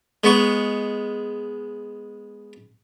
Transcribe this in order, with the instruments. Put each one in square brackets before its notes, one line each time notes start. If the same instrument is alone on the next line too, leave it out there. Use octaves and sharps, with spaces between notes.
[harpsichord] G#3 B3 C#6